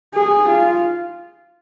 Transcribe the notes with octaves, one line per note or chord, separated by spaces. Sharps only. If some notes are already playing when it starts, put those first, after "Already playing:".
G#4
F4